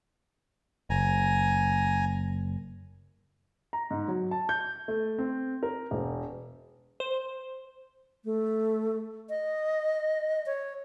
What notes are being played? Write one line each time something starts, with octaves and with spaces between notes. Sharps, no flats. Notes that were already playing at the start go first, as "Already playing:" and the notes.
F#1 G#5 A#5
A#5
G#2
F#3
A5
G6
A3
C4
A#4
E1
C5
A3
D#5
C#5